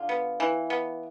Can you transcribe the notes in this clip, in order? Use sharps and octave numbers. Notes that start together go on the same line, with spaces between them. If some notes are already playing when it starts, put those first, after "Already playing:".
Already playing: D3 F4
B3
E3
B3